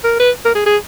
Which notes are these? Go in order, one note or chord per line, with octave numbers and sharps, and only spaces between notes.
A#4
B4
A#4
G#4
G#4